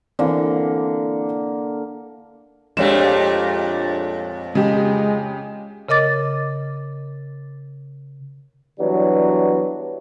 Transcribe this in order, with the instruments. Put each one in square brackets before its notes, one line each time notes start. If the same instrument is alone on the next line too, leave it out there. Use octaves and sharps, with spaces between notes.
[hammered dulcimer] D3 A#3 [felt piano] E3 C4 D5
[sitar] F2 A#2 A3 [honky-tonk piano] G#3 D4 [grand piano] G4 C#5 E7
[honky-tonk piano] C#3 G4 [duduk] G#3
[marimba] C#3 A#4 D#5 D6 A6
[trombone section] E3 F#3 G3 B3 D4